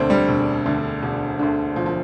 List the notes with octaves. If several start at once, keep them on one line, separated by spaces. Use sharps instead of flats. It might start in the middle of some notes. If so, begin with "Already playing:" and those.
Already playing: E1 D2 D3 C4 D4
G3
E1
D2 D3
E1
D2 D3
E1 F3
F3